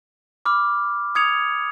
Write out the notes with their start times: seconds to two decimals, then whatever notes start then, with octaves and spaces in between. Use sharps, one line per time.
0.45 B5 D6 F6
1.15 D#6 G#6 C#7 F7